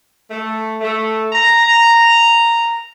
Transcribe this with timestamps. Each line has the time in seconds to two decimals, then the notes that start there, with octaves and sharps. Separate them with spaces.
0.31 A3
0.81 A3
1.33 A#5